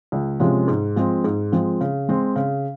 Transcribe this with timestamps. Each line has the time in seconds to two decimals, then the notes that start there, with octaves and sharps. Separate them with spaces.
0.12 C#2
0.40 C3 F3 G#3 C#4
0.68 G#2
0.96 F3 G#3 C4
1.24 G#2
1.52 F3 G#3 C4
1.81 C#3
2.09 G#3 C4
2.36 C#3